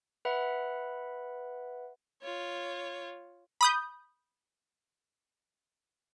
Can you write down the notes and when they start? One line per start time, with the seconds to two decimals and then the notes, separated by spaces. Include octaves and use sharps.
0.25 B4 E5 F#5 B5
2.22 F4 C#5
3.61 B5 D#6 G6